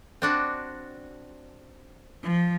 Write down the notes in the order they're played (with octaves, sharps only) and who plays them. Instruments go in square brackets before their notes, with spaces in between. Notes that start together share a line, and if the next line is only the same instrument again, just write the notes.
[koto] C4 D4 F#4
[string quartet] F3